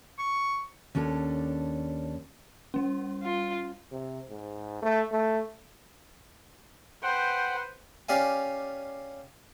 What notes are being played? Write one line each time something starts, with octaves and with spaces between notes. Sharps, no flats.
C#6
D#2 C#4 D4 A4
G3 C#4
F4
C3
G#2
A3
A3
B4 C5 F#5 G5
C#4 G4 D5 F5 G#5